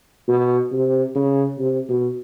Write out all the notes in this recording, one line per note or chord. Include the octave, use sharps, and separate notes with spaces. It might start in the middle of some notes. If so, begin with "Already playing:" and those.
B2
C3
C#3
C3
B2